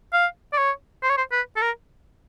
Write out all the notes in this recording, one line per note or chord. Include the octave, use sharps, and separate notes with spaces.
F5
D5
C#5
C5
C#5
C5
B4
A4
A#4